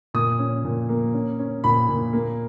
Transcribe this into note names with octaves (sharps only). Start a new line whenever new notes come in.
A#2 D#6
C#4
A#2
A#3
C#4
C#4
A#2 B5
A#2
A#3